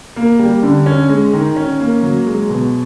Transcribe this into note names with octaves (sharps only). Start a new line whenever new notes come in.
A#3
G3
D3
C#4
G#3
D#3
C#4
A#3
F#3
G#3
B2